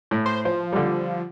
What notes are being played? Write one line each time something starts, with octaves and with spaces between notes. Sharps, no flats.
A2
C5
F3 C5
D3 G3